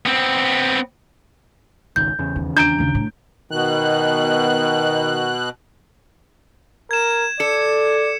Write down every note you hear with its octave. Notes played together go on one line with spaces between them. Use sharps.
B3 C4
G#1 C#2 D#3 G6
E2 C#3
D#2 D#3
D4 A#5 G6 D7
D#2 C#3
A2
B2 D#3 F#6
A#4 G#6 E7
A4 D5 C#7